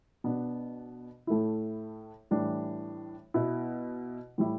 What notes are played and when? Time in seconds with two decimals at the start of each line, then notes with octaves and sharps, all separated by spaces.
0.24 B2 B3 D4
1.27 A2 A3 E4
2.31 A2 E3 G3 D4
3.34 B2 B3 E4
4.38 A2 G3 E4